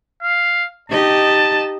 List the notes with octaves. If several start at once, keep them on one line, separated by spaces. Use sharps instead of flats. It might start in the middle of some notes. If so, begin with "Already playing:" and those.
F5
D#4 G4 D#5 A5